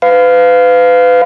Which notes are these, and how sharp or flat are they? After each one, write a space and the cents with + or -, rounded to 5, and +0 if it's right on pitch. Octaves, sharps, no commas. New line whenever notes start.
B4 +35 F5 +0